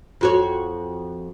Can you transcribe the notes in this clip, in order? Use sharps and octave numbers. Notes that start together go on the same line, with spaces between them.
F2 F#4 C#5